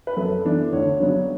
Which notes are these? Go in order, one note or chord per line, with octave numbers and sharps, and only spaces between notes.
B4
F#2 A4
E3 B3 D4
D2 C#5
C#3 F#3 B3 D4